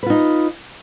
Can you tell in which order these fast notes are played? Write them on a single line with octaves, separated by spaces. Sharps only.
B4 F4 D#4